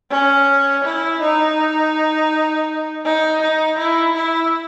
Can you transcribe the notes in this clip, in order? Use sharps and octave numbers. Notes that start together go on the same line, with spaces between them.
C#4
E4
D#4
D#4
D#4
E4
E4